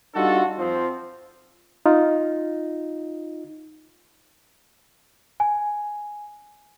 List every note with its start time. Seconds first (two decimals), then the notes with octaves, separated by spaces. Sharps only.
0.15 G3 D4 D#4 F4 F#4 A4
0.58 F2 F3 C4
1.86 D#4 F4
5.40 G#5